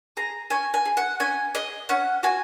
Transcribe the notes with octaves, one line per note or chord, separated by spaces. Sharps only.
G#4 A#5
C#4 G#5
G#5
G#4
F#5
C#4 G#5
G#4 D#5
C#4 F#5
F#4 G#5